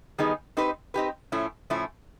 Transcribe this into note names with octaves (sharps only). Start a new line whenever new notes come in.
D#3 G3 B3 D#4 G#4
C4 D#4 G4 B4
C4 D#4 G4 B4
A2 F3 A3 C#4 E4
A2 F3 A3 C#4 E4